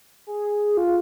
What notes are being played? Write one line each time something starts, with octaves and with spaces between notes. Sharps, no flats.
G#4
F4